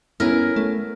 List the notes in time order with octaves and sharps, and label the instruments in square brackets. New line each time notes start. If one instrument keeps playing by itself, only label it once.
[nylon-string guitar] B3 B4 [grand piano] C#4 E4 [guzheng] A#4
[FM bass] A3